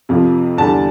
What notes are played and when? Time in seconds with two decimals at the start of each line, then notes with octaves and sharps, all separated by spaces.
0.09 F2 C3 F3
0.57 E2 D3 G3 A5